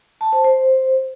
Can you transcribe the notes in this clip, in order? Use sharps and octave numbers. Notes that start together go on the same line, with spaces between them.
A5
C5
C5